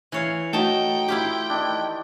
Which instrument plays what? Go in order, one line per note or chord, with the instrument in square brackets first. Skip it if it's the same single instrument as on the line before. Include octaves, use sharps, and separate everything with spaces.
[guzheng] E3 C#5 F5
[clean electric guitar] A3 F#4 [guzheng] D#4 A5 [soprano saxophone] G5
[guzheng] E4 F4 G4
[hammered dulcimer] D#3 D4